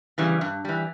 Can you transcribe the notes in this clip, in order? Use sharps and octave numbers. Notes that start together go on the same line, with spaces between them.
C#3 E3 G3
G2
E3 G3